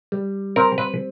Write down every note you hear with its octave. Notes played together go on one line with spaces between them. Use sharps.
G3
C4 A#4
B4